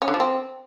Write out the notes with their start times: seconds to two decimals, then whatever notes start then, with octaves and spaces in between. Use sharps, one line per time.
0.02 C#4
0.08 D3
0.14 F3
0.20 C4